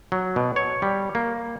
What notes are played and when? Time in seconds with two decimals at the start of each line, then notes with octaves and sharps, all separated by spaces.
0.12 F#3
0.36 B2
0.56 C#5
0.82 G3
1.15 A#3